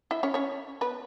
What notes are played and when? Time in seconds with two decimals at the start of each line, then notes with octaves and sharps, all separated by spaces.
0.11 E4 E5
0.23 C#4 C#5
0.34 C#4 C#5
0.81 B3 B4